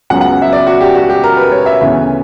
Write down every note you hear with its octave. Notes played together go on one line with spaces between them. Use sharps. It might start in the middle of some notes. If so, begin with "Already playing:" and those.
C#2 C#3 F#3 B3 F#5
F#5
E5
D5
F#4
G4
F#4
G4
A#4
B4
C#5
E5
D2 C#3 E3 B3